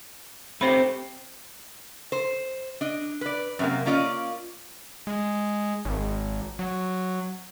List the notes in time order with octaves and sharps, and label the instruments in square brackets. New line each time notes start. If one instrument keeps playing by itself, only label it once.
[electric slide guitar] A3 C4 G4 [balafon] C5 B5
[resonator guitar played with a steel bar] C5
D4 D#5
B4 D5
F#2 C3 A#3
A#3 C#4 F4 D5 D#5
[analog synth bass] G#3
G#1
F#3